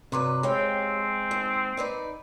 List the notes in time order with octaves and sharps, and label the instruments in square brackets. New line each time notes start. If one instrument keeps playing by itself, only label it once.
[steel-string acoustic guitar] G2 F#3 B4 [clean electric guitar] C3
[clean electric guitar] G#3 [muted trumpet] C4 [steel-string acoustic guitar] G4 C#5 F5
[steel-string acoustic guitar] D#2
D#4 B4 D5